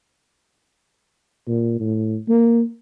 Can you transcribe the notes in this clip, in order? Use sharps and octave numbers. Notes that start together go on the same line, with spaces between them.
A#2
A2
A#3